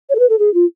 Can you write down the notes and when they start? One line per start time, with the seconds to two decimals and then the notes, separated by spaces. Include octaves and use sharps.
0.10 C#5
0.15 A4
0.19 B4
0.29 A4
0.39 G#4
0.54 F4